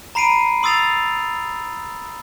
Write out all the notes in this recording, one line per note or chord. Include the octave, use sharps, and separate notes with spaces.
A#5 B5 C7 D7 D#7
C6 D#6 E6 A6 C7 F7